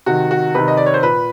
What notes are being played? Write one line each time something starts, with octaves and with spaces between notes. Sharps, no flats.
C3 D#3 F#4
F#4
C3 D#3 B4
D#5
D5
C#5
C5
A#2 B4